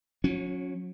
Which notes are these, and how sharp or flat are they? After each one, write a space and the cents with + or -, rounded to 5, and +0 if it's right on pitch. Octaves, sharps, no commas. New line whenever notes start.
F#3 -35 C#4 +0